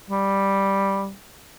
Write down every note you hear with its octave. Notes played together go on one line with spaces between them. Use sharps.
G3